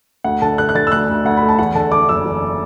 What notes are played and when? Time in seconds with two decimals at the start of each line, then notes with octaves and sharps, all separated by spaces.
0.24 D2 F#5
0.42 D3 A5
0.58 D3 F#6
0.69 F#6
0.75 D3 A6
0.87 E6
0.92 D2 F#6
1.09 D2
1.25 D2 F#5
1.37 B5
1.43 A3
1.49 A5
1.59 E2 F#5
1.75 D3 A5
1.92 D3 D6
2.09 F#1 E6
2.25 E2